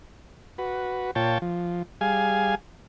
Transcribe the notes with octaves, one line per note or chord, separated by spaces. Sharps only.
F#4 B4
A#2 F4 C#5 G5 A5
F3
G3 G#4 F5 G#5